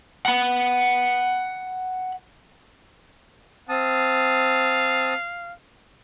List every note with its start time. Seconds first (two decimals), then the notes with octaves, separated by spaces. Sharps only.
0.26 F#5 B5
3.69 C4 F5 A5 D#6